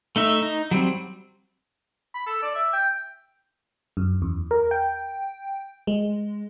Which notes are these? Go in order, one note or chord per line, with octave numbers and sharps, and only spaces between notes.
A3 D#4 E5
D#4
F#3 G3 C4
B5
A4
D5
E5
G5
F#2
E2
A#4
G5
G#3